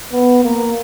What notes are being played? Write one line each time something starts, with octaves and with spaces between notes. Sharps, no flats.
B3
A#3